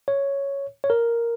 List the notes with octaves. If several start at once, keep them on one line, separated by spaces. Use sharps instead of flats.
C#5
C#5
A#4